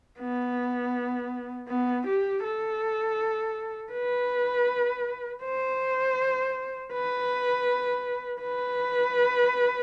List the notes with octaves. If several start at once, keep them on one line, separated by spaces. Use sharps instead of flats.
B3
B3
G4
A4
B4
C5
B4
B4